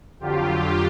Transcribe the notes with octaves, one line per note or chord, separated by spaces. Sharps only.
F2 D3 F#3 F4 G4